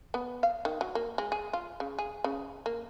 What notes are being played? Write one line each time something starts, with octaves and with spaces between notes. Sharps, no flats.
B3
F5
D#3
F#3
A#3
G#3
G#4
F4
C#3
G#4
C#3
A#3